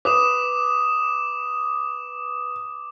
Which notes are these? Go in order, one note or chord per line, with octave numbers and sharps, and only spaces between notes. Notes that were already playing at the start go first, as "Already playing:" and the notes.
B4 D6 D#6 E7